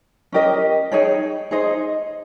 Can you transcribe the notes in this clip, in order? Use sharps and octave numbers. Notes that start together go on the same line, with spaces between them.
C#4 G4 A#4 D#5
D#4 G#4 C#5 G5
D#4 G#4 C5 D#5